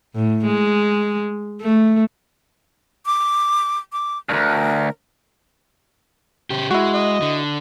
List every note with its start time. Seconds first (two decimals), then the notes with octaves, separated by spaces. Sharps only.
0.15 A2
0.45 G#3
1.61 A3
3.06 D6
3.92 D6
4.29 D2 G2 A#4
6.50 C#3 G4
6.71 G#3 E4 F#4
6.94 D#5
7.22 D3